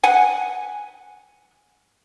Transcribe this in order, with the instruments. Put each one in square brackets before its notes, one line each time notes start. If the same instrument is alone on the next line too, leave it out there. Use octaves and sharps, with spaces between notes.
[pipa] F#5 G#5